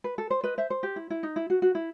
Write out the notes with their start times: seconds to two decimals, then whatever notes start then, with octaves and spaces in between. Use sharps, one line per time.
0.04 B4
0.18 A4
0.30 C5
0.44 B4 D#5
0.58 C5 E5
0.70 C5
0.83 G4
0.96 E4
1.10 E4
1.23 D#4
1.36 E4
1.50 F#4
1.62 F#4
1.75 E4